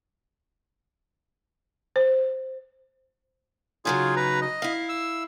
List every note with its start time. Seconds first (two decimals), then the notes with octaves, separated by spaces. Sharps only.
1.96 C5
3.85 C#3 F#3 D#4 F4 G#4
4.16 B4 A#5
4.41 D#5
4.62 E4 F5
4.89 E6